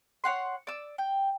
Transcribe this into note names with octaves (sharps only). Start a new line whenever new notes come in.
C#5 F5 F#5 C6
D5 E6
G5